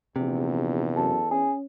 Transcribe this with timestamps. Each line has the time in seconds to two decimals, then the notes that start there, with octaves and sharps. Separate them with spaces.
0.16 A#1 E2 C3
0.96 F#2 A4
1.31 C#4 G#4